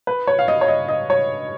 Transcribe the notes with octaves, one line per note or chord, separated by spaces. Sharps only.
B4
C#5
F5
D#5
C#5
D#5
D#5
C#5